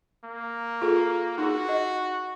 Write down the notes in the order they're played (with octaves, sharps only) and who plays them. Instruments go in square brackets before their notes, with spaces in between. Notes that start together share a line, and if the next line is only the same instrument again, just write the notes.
[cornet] A#3
[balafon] F4 G#4 A4
[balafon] D#4 G#4 [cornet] F#4
[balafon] D#5